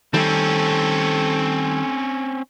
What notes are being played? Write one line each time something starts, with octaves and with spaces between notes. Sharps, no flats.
D#3 G3 A3 C4 C#4 A4